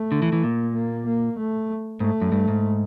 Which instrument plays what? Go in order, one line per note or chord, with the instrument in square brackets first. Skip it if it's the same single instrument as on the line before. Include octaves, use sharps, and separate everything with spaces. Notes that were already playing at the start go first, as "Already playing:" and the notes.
Already playing: [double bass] A3
[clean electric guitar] D3
E3
E3
[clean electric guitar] A#2 [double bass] A#3
[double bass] A#3
A#3
A3
[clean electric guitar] G#2 [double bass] A3
[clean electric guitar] F#2
G2
G#2